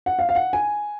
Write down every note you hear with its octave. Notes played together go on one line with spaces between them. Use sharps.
F#5
F5
F5
F#5
G#5